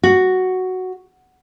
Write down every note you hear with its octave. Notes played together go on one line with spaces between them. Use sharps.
F#4